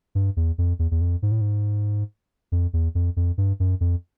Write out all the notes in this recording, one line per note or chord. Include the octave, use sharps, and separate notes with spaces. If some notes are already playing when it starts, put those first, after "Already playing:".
G2
E2
F2
E2
E2
F2
G#2
A2
G#2
F2
E2
F2
F2
G2
F#2
F2